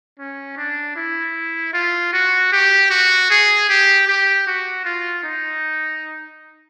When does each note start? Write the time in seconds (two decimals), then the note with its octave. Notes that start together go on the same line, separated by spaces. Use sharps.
0.19 C#4
0.57 D4
0.96 E4
1.74 F4
2.13 F#4
2.52 G4
2.90 F#4
3.30 G#4
3.69 G4
4.08 G4
4.47 F#4
4.85 F4
5.24 D#4